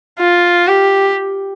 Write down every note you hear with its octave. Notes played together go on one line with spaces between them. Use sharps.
F4
G4